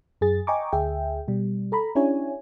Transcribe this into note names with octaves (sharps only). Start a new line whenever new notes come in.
F#2 G#4 A6
D#5 G5 G#5 A#5 C#6 D6
D2 G#4 E5 G5
B2 G3
A4 A#5 B5
C#4 D4 E4 G4 C#5 G#5